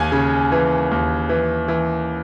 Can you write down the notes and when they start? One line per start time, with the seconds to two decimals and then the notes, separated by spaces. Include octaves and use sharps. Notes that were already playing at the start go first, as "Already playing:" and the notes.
Already playing: D#2 G#5
0.12 C#3
0.52 E3
0.91 D#2
1.29 E3
1.68 E3